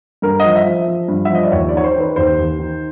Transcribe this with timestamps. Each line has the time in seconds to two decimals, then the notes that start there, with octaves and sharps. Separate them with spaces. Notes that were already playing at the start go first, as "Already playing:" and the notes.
0.22 G2 A#4
0.40 F3 D#5
0.56 E5
0.66 F3
0.88 F3
1.08 G2
1.25 E5
1.30 F3 D#5
1.43 D5
1.52 D#2 C#5
1.69 D5
1.74 D#3 C#5
1.84 C5
1.96 D#3 B4
2.16 D#2 C5
2.39 D#2
2.59 D#3